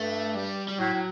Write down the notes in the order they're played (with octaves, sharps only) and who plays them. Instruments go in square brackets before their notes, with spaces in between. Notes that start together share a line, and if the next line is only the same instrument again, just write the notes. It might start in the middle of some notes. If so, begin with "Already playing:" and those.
Already playing: [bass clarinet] G2 [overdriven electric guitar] A3
[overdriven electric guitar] G3
G3
[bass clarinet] A2 [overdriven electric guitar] F#3
[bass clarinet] A2